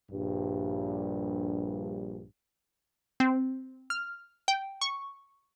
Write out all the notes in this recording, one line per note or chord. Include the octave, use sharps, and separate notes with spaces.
A#1 G2
C4
F6
G5
C#6